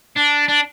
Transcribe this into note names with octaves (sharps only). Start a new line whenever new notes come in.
D4
D4